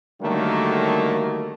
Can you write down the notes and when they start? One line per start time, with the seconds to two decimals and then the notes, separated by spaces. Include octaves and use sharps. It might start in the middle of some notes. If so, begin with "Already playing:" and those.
0.21 D3 D#3 F#3 G3 A3 A#3